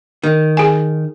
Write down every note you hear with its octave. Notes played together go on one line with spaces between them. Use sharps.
D#3
G#4 G#5